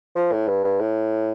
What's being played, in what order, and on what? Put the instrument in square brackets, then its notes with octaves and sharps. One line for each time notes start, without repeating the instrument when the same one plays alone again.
[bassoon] F3
A2
G2
G2
A2